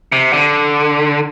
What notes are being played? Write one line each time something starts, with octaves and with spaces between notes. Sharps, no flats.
C3
D3